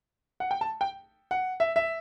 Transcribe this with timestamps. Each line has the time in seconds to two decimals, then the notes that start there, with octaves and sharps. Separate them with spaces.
0.40 F#5
0.51 G5
0.61 A5
0.81 G5
1.31 F#5
1.60 E5
1.76 E5